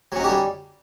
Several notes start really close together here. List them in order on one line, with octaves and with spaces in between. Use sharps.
F#3 C#4 D#4 G4 G3